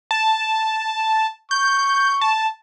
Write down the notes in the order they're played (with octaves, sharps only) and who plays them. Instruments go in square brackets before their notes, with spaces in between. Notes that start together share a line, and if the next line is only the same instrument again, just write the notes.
[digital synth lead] A5
[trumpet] C#6 [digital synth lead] G6
[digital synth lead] A5